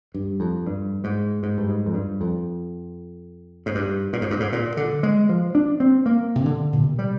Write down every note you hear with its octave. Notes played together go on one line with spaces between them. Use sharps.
G2
F2
G2
G#2
G#2
G2
G#2
F2
G2
F2
G#2
G2
A#2
G#2
G2
G#2
A#2
D3
G#3
F3
D4
C4
A#3
C3
D3
A#2
C3
G3